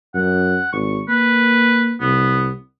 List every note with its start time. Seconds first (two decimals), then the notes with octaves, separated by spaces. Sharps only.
0.14 F#2 F#5
0.72 G#1 C#6
1.08 A#3 B4
2.00 C2 B3